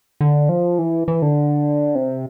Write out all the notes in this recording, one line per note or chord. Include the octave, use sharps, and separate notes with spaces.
D3
F3
E3
E3
D3
C3